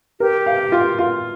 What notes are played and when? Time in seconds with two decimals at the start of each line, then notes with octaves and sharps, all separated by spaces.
0.20 G4 A#4
0.46 F5
0.72 F4
0.99 F4